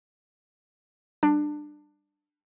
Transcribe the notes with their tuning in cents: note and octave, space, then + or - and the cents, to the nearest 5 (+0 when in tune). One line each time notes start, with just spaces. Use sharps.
G3 +0 D4 +20